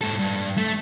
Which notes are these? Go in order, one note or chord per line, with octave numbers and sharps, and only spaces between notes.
G#2 A4
G2
A3